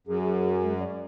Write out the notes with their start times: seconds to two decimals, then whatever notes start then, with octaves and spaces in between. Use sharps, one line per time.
0.07 F#2 G#4
0.22 G#4
0.63 G#3
0.79 D5